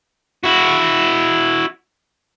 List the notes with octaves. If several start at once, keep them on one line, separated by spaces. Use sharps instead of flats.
E4 F#4